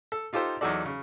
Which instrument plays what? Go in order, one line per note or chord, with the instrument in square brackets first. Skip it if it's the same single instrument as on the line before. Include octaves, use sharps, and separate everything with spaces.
[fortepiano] A4
D#4 F4 G4 A4 C5
E2 F#3 D#4 F#4 A4 D5
C#3